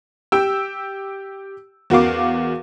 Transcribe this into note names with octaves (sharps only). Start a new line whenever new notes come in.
G4 G5 E6
E2 F#4 A#4 F5 D6